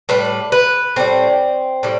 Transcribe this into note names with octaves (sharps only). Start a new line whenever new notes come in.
A2 G3 B4
B4
A2 G3 C4
A2 G3